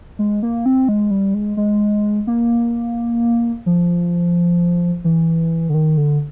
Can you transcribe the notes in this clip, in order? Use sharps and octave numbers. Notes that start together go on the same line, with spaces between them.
G#3
A#3
C4
G#3
G3
G#3
G#3
A#3
F3
E3
D3
D#3
D3